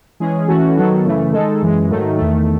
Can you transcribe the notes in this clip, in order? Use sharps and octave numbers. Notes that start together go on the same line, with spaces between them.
E3 G#3 C#4 G#4
E3 A3 C#4 F#4 A4
D#3 F#3 B3 F#4 A4
F#2 C#3 E3 A3
D#3 G#3 D#4 A4
F#2 E3 G#3
G#2 D#3 F#3 A3 D#4
E2 D#3 A3